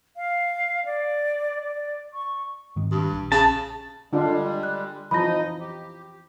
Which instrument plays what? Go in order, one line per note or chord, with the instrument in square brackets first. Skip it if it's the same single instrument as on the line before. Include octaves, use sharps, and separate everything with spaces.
[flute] F5
D5
D5
C#6
[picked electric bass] G#2 D#3
[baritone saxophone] G2
[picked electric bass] A#1
[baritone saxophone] C#3 [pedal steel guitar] A5
[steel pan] D3 D4 F4 [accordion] G3 G#3
[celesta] F#6
[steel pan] E3 F3 [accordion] D#4 D#5 [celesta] B5 A#6
[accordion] G4